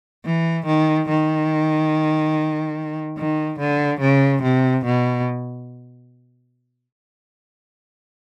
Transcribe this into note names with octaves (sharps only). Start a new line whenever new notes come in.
E3
D#3
D#3
D#3
D3
C#3
C3
B2